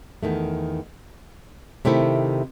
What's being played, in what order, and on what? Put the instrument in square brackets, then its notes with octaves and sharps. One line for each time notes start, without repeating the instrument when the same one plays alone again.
[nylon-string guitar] E2 D#3 A3
C3 D#3 A3 C4 E4